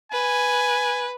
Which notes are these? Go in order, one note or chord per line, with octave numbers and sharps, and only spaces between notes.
B4 G#5